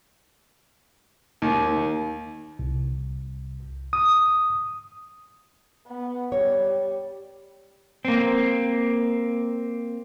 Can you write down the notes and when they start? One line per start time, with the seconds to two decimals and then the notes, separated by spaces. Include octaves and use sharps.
1.42 D#2
2.59 C2
3.93 D#6
5.87 B3
6.32 G3 C#5
8.05 A#3 C4